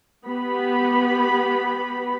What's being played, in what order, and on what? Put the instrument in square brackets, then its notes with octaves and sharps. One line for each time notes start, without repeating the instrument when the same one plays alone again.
[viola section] B3 G4 B5